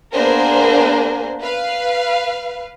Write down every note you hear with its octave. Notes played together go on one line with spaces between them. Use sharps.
A#3 B3 D4 G#4 A#4 C5
B4 F5